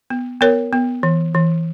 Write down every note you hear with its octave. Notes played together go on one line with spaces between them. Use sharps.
B3
B3 A#4 C#5
B3
E3
E3